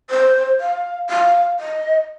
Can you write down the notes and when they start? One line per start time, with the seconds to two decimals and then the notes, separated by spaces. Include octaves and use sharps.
0.10 C5
0.61 F5
1.10 F5
1.60 D#5